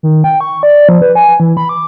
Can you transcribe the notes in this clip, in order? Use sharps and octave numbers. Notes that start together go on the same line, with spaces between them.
D#3
G5
C#6
D5
F3
B4
G#5
E3
B5
D6